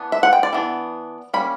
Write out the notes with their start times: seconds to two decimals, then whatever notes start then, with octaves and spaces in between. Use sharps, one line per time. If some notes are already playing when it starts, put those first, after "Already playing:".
Already playing: E3 B3 D4
0.12 E5
0.23 F#5
0.33 G5
0.43 D5
0.53 E3 B3 D4
1.33 G3 A#3 C#4 B5